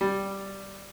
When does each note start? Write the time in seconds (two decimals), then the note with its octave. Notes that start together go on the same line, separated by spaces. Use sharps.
0.01 G3